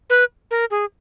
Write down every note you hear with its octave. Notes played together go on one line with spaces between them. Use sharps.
B4
A#4
G#4